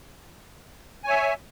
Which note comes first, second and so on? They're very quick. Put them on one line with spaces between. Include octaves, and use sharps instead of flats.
G#5 C#5 E5